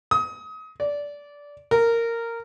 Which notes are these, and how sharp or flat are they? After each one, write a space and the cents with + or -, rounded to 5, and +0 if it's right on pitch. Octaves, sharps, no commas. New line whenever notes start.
D#6 +30
D5 -15
A#4 -10